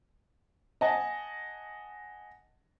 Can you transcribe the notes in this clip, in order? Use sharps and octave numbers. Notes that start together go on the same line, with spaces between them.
D#5 F#5 G#5 A5